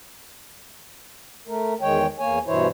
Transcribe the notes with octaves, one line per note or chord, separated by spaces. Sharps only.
A3 A#4
E2 D#3 G#3 C#5 G5
E2 A#3 C#5 G#5
G2 B2 E3 E4 C5 C#5